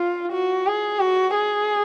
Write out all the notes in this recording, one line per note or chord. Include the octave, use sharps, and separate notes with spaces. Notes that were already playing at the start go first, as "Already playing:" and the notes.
Already playing: F4
F#4
G#4
F#4
G#4